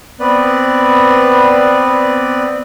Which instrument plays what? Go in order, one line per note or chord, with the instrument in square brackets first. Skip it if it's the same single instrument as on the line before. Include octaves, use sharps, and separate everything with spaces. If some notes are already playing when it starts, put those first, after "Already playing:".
[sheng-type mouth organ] B3 C4 B4 D5